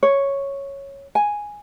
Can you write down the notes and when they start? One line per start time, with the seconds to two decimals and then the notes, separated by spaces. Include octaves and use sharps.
0.03 C#5
1.15 G#5